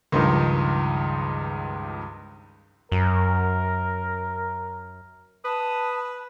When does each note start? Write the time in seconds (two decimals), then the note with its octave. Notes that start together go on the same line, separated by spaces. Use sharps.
0.12 C#2 G2 D#3 F3 D#4
2.92 F#2 A#4
5.45 B4 A5 D#6